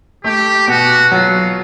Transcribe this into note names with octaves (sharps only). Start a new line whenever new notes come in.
A3 G4
B2 F#4
F#3 F4